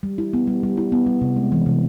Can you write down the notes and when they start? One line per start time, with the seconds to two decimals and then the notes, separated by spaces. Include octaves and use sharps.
0.03 G3
0.18 E4
0.33 B3
0.47 G3
0.63 G3
0.77 E4
0.92 B3
1.07 G3
1.21 C3
1.36 G#3
1.52 E3
1.66 C3